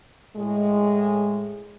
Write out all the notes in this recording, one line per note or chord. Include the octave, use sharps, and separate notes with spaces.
A2 G#3